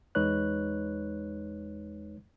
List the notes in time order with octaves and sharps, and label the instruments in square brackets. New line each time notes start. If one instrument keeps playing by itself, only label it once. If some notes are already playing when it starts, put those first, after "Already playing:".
[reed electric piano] E2 G#3 D#4 B4 C#5 F#6